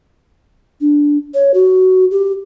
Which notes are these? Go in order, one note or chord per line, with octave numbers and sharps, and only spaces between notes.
D4
C#5
F#4
G4